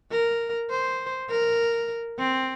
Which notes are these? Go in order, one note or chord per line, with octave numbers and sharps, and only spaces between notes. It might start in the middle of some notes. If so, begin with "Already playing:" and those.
A#4
C5
A#4
C4